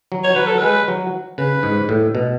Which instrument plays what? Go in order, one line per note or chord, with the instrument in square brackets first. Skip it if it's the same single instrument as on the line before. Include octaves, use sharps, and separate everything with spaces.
[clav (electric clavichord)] F#3
[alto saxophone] C#5
[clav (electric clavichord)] F#3 [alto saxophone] B4
[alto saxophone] A4
[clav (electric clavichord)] G#3 [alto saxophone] B4
[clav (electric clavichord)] F#3
[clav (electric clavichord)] C#3 [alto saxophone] B4
[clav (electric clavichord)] G#2
A2
B2